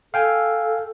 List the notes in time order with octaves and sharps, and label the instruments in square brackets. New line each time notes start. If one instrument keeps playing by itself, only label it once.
[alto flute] A4 [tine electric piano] F5 G5 G#5